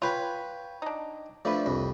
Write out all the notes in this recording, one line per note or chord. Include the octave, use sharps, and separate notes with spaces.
F4 B4 C#5 G5 G#5
D4 D#4
F3 A3 D4 B4 D5
C2 F2